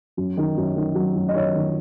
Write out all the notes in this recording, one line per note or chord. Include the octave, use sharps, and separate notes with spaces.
F#2
D#3
F#2
D#3
F#3
F#2
D#5
D#3 C#5
D#3